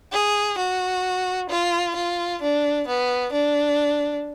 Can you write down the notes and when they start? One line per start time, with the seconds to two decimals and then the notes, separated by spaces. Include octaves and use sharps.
0.13 G#4
0.58 F#4
1.49 F4
1.96 F4
2.42 D4
2.88 B3
3.33 D4